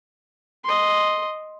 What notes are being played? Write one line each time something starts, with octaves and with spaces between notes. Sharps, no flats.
D#5 C6